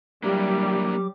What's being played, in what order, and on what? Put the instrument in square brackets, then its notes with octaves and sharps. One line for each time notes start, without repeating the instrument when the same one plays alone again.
[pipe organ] F#3 G4 D6 [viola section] G3 [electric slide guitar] A#3 D4 E4